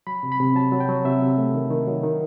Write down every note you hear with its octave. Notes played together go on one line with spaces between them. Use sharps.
F#3 B5
C3
B5
C3
F#3 A5
F#3
G5
F#3
C3 E5
C3
A3
D#3
D#3
F#3
D#3